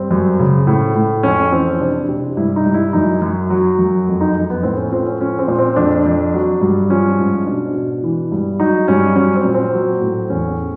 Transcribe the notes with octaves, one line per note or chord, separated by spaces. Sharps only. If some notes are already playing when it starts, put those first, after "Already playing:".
Already playing: G2 C4
F#2
C#3
A2
A2
F2 C#4
E3 C4
C3 D4
C3
G2 E4
D#4
G2
E4
F#2 D#4
F#2
F#3
F#2
F2
D#4
F2
B3
A2 C4
C#4
F3 C4
C#4
F3 C#4
C4
A#2
C4
F2 D4
F2
F#3
G2
F3 C#4
G#2
B2 D4
B2
E3
G2
F#3 D#4
G2 C#4
F#3 C#4
C4
A#2
C4
F#3
A2
E2 C#4